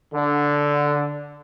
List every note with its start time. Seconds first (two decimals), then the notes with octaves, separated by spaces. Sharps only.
0.14 D3